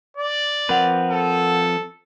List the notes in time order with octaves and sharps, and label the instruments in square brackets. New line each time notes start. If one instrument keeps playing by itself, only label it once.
[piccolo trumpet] D5
[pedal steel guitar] F3 C4 B4 [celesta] A#4 F#5 F7
[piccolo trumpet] A4